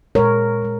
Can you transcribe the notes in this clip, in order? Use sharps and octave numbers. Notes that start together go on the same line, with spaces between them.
A#2 G#3 A#4 C#5
A#2 G#3